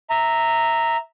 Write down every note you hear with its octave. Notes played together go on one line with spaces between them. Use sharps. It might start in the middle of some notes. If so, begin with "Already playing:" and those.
E5 A#5